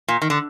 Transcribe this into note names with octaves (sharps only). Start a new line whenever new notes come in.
A#2
D#3
D3